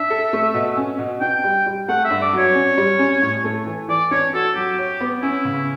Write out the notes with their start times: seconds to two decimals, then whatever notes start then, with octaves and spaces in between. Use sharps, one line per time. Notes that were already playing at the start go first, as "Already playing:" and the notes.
Already playing: D4 E5
0.10 A4
0.33 A3
0.54 B2
0.77 C#4
0.99 B2
1.21 D4 G5
1.44 G3
1.66 G3
1.88 A3 F#5
2.05 E5
2.10 G2
2.22 D5
2.33 F#3
2.38 C#5
2.55 C#4
2.78 G3
2.99 C#4
3.22 A2
3.44 A3
3.66 E3
3.88 E3 D5
4.11 D4 C#5
4.33 F#4 A4
4.56 F#3 G4
4.78 C#5
5.01 B3
5.22 C#4 E4
5.45 C#3